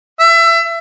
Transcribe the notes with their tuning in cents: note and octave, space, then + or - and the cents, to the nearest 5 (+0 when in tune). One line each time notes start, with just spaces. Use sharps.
E5 +25